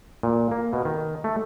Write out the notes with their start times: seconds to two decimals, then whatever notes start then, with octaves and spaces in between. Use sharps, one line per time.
0.23 A#2
0.51 A#3
0.73 B2
0.85 D#3
1.24 A3